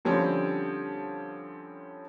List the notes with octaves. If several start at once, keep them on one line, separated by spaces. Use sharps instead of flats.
D3 F3 G3 C4 C#4